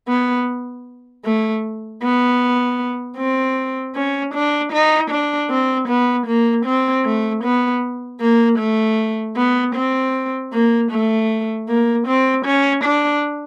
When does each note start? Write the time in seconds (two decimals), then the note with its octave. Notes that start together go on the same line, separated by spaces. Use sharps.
0.08 B3
1.25 A3
2.02 B3
3.17 C4
3.95 C#4
4.34 D4
4.72 D#4
5.11 D4
5.50 C4
5.88 B3
6.27 A#3
6.66 C4
7.05 A3
7.43 B3
8.21 A#3
8.59 A3
9.36 B3
9.75 C4
10.53 A#3
10.91 A3
11.68 A#3
12.07 C4
12.45 C#4
12.84 D4